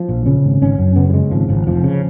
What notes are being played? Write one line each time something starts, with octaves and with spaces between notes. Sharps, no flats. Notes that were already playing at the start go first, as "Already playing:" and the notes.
Already playing: F3
A#1
C#3 C#4
G#1
G#1 C#4
F#2
C#3 B3
F#3
C#3 G#3
G#1 F3
G#1 F3
F1 F3
C#3